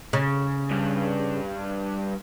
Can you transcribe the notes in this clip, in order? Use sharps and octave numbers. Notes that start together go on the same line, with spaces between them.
C#3
G2